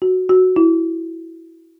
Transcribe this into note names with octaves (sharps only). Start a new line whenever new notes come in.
F#4
F#4
E4